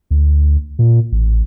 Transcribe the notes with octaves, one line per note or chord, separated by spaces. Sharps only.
D2
A#2
A1